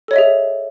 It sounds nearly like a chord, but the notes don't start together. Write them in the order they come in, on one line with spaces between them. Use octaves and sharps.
A4 C#5 D#5 E5 G#4